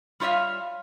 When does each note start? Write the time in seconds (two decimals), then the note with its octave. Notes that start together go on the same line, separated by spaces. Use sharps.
0.20 G3 F4 C#5 E5 F5